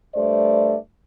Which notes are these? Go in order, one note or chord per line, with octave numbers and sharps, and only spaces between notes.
G2 A3 C5 D5